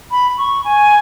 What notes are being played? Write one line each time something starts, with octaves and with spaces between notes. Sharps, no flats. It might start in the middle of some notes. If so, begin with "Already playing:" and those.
B5
C#6
G#5